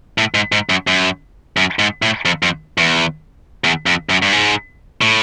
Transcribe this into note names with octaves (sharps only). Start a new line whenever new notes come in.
A2
G#2
G#2
F#2
F#2
F#2
G#2
A2
F2
F2
E2
E2
F2
F#2
G2
G#2
A2